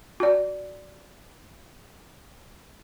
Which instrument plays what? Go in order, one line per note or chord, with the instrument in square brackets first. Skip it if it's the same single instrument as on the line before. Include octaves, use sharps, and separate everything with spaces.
[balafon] F#4 D5